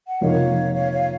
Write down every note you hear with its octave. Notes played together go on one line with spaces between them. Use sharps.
F#5
F2 C3 F3 A#3 D#4 C#5 F5
C#5 F5
C#5 F5